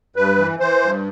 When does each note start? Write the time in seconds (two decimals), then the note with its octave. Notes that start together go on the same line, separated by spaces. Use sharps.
0.16 G2 B4
0.38 E3
0.59 E3 C5
0.81 G2